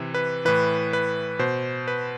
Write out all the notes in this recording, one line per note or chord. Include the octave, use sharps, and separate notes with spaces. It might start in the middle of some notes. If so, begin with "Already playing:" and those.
Already playing: C3 E3
B4
A2 E3 B4
B4
B2 C5
B4